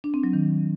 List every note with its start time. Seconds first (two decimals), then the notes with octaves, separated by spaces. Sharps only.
0.04 D4
0.14 C4
0.24 F#3
0.33 D#3